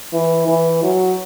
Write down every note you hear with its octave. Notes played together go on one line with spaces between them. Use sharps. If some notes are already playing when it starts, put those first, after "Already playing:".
E3
E3
F#3